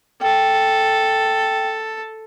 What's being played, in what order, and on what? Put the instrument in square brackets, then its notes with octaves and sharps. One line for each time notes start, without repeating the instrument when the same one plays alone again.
[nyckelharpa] A4 [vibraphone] G5